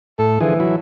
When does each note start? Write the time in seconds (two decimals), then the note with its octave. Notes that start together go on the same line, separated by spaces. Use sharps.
0.19 A2 A4
0.40 D3 E3 F3 G#4
0.60 F#3 E4